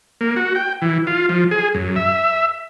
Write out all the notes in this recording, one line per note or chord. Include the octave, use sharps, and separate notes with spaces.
A#3
F#4
G5
E3
F4
F3
G#4
F#2
E5